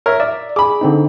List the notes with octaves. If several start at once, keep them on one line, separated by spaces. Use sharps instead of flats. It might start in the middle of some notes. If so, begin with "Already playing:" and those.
A#4 C#5 E5
D5 E5
G#4 B5 D6
D3 C4 D#4